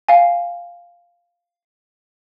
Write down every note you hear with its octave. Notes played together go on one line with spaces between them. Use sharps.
F5 G#5